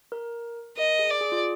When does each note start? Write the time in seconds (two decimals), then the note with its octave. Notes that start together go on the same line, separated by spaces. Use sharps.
0.12 A#4
0.77 A#4 D#5
0.99 G#4
1.10 D5
1.21 G#4
1.32 F4